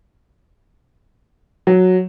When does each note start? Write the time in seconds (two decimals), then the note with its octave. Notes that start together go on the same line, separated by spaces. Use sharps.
1.67 F#3